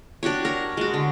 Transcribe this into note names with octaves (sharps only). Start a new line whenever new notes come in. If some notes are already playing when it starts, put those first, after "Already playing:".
D4 F#4 G4 C#5
A#4 C#5
G#3 F#4
D3